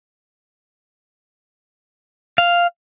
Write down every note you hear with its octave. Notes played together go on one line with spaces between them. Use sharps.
F5